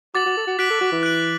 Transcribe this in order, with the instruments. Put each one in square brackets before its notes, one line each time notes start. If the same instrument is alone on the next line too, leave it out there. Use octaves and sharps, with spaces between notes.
[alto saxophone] F#4 [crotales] D6 A6 F#7
[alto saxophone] F#4
A4
F#4
[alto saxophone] F#4 [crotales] F#6 B6 D7 F#7
[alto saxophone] A4
F#4
E3
[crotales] F#6 D7 F#7